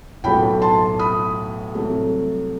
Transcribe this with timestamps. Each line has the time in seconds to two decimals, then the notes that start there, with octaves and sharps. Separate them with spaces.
0.24 B1 A2 F#3 A3 G5 B5
0.62 A5 C6
0.99 B5 D#6
1.75 C2 C3 F#3 A3